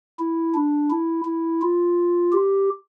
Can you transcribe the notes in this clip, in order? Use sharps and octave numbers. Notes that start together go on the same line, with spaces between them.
E4
D4
E4
E4
F4
G4